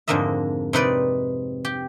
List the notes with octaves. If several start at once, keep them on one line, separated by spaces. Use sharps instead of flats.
F2 G#2 D3 A#3 D#5 E5
C3 D#4 B4 D5
G4